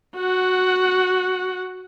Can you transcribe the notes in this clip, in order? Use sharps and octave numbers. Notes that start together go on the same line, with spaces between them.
F#4 F#5